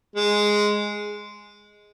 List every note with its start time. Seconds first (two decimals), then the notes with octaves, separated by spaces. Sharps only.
0.16 G#3